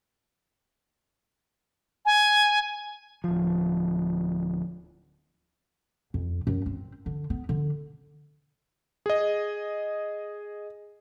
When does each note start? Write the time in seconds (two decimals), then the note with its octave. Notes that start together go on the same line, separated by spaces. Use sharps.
2.06 G#5
3.24 D1 F3
6.14 F2
6.47 F#2
6.66 C4
7.06 D3
7.30 B3
7.49 D3
9.06 G#4 D#5